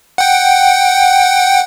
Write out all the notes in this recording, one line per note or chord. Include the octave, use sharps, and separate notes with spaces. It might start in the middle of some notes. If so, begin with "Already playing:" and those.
F#5 G5